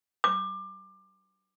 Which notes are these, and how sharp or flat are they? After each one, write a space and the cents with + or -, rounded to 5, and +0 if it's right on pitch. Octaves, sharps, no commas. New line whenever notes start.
D6 +25